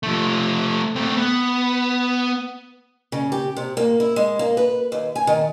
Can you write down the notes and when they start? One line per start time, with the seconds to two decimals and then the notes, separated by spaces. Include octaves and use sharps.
0.03 F3 A3
0.96 A3 C4
1.16 B3
3.12 C#3
3.32 G4
3.57 C3
3.77 A#3
4.00 E4
4.16 G#3
4.39 A#3
4.57 B4
4.92 D#2
5.16 G#5
5.27 D#3